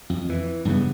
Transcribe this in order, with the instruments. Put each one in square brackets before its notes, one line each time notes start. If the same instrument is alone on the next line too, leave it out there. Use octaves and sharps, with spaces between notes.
[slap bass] F2
E3
G2 C#3 B3